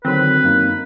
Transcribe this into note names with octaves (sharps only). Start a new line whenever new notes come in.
D3 D#3 F#3 C4 B4
F#2 A#3 D#4